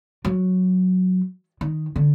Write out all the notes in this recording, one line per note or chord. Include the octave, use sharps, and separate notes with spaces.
F#3
D#3
D3